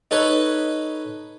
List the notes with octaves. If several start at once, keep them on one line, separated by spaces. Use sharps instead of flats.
D#4 A4 B4 C#5